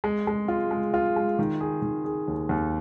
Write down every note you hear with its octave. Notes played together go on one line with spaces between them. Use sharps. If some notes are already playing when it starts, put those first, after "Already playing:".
G#3
G#3
F4
G#3
F4
G#3
D#3
G#4
D#3
G#4
D#2
D#2